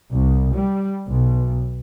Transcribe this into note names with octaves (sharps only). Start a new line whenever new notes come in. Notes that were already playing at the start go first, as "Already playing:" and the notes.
C2
G3
B1